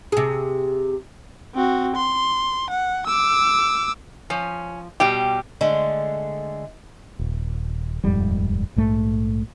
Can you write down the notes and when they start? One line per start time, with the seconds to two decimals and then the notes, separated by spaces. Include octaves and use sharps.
0.12 C3 G#4
1.55 C4 F#4
1.96 C6
2.70 F#5
3.07 D6 E6
4.30 F3 C#4
5.00 B2 G3 G4 G5
5.61 D3 G#3 A3
7.19 D#1
8.04 D#1 F2 G#2 G3
8.76 A#1 G#2 A3